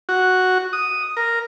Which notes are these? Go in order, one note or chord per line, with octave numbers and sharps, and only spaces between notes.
F#4
D#6
A#4